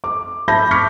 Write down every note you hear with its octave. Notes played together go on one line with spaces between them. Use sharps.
D6
E5 A5 B5 G6 A#6
C#6 D6 F6 G6 B6 C#7